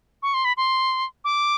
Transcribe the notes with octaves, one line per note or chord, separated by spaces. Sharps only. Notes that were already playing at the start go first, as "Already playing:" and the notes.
C#6
C6
B5
C6
D6